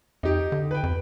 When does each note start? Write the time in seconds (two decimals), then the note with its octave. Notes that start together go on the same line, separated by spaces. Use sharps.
0.23 F2 D#4 G4
0.52 D3
0.71 B4 G5
0.83 F2